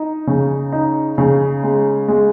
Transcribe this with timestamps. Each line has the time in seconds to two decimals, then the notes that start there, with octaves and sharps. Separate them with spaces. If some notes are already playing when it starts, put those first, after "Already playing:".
Already playing: D#4
0.27 C#3
0.73 D#4
1.18 C#3
1.63 G#3
2.08 G#3